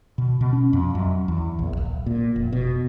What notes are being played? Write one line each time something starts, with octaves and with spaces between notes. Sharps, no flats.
B2
B2
C#4
F2
F#2
E2
A#1
D1
A#2
F1
B2